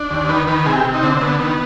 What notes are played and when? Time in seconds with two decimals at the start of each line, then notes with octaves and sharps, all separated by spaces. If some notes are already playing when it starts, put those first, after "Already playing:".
Already playing: D4
0.11 D#2
0.29 D#3 B4
0.47 D#3 B4
0.66 C3 G#4
0.75 G4
0.85 C3
0.94 D#4
1.03 D3 C4
1.17 C4
1.21 D3 B3
1.40 D#3 B3